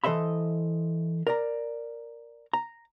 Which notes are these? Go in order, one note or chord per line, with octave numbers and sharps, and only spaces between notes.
E3 A4 C5 D#5 E5 B5
A#4 D5 A#5
A#5